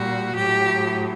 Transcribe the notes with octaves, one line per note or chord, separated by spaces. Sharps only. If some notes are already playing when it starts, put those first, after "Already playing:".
Already playing: A#2 G3 F#4
A2 F#3 G4